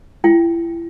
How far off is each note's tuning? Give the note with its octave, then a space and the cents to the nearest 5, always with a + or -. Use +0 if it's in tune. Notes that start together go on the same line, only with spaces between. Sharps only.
E4 +35 G5 +0